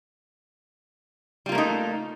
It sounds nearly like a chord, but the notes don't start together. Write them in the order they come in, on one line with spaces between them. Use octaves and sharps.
G3 F4 A#3 A3 D#4